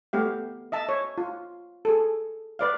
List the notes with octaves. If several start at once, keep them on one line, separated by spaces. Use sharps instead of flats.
A3 B3 G4 F5
D#5 E5 A5
C#5
F4
G#4 A4
B4 D5 F5